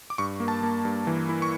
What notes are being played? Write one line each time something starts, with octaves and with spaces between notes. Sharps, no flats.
D6
G2 C#6
A#3
A5
A#3
G2
E3
E4
C#6